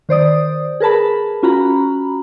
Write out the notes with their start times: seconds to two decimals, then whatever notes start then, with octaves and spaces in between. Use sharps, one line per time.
0.09 D#3 C5 D5 D#6
0.80 G#4 A#4 B4 A5 B5
1.43 C#4 F4 F#4 A#5 B5